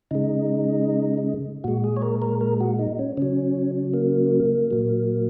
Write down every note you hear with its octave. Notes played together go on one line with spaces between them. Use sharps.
C#3 G#3 D#4
A#2 G#3 F#4
G#4
C#5
A#4
A#4
A#4
F#4
D#4
C#4
C#3 F#3 C#4
A#3
A#2 F#3